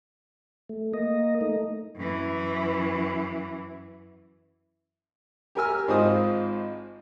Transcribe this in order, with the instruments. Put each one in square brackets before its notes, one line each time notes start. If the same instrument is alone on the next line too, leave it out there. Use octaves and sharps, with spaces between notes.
[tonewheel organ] A3
A#3 D#5
A3 D#4
[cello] F#2 E3
[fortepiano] G4 A#4 G#5 E6 F6
G#1 G#2 F4 C5 D#6